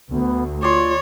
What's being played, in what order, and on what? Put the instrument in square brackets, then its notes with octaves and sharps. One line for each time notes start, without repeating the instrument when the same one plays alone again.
[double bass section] D2 [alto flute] B3
[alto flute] F4 [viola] C#5 [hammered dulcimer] D5 C6